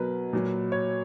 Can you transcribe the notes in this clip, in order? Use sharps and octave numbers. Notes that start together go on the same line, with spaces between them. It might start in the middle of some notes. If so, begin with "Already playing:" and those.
Already playing: B2 F#3 A#4 B4
A#2 F#3
C#5